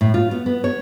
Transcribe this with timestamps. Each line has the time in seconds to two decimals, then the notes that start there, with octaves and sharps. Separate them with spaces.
0.01 A2
0.14 F4
0.31 B3
0.46 B3
0.64 C#5